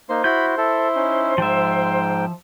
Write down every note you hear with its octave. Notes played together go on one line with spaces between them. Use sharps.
A#3 D#4 C5
E4 F#4 B5 G6
E4 A4
C#4 D#4
G#2 F3 E5 G5